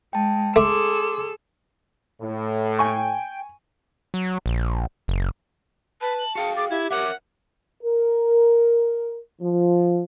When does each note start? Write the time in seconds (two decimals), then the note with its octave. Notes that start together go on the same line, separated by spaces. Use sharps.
0.13 G#3 G5 A5
0.56 A3 G#4 A4 C6 D6 E6
2.22 A2
2.79 G5 G#5 C#6
4.14 F#3
4.46 A#1
5.08 F#1
6.01 B4 A5 B5
6.19 F#7
6.35 F#4 G#4 F5 G5 C#7
6.56 G#4 D6 A6
6.70 E4 G4 G#6
6.91 A#4 C#5 E5 F#5 D6
7.83 A#4
9.41 F3